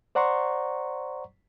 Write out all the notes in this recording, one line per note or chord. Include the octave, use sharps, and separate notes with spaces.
C5 D5 F#5 A#5 C6 C#6